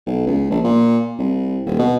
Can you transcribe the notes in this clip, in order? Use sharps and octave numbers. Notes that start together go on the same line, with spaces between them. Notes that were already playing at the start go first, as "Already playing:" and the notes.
B1
C#2
A#1
A#2
C2
D#1
B2